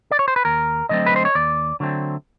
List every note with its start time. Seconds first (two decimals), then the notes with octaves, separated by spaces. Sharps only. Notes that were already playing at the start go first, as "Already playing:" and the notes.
0.11 D5
0.19 C#5
0.28 C5
0.36 B4
0.45 D#2 A#4
0.89 D3 F#3 A3 C4 D#5
1.06 B4
1.16 C5
1.25 C#5
1.35 D#2 D5
1.80 D3 F#3 A3 C4